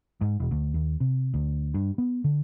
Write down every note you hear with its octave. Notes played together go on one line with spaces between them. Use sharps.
G#2
E1
D2
D#2
C3
D2
G2
B3
D3